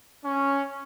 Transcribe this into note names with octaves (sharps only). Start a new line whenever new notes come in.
C#4